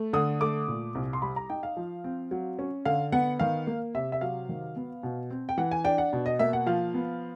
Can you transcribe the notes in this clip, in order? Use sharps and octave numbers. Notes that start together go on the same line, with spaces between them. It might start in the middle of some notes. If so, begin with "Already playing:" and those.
Already playing: A3
D3 D#6
A3 D6
A#2
C2
C6
G3 B5
A#5
D#4 G5
F5
F3
C4
F#3
C#4
D3 F5
B3 F#5
D#3 F5
A#3
C3 E5
E5
F#3 F5
D#3
B3
B2
C4
G5
E3 F#5
G#5
D4 G5
F#5
B2
D#5
A#3 E5
F#5
F3 F5
B3